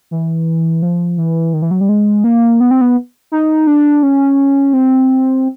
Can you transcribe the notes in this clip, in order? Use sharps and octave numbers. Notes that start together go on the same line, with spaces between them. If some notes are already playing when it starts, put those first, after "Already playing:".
E3
F3
E3
D#3
E3
F#3
G3
G#3
A#3
B3
C4
B3
D#4
D4
C#4
C4